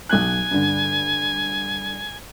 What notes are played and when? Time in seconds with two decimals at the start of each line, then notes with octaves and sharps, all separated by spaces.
0.09 B1 G#5 F#6
0.51 G2 D3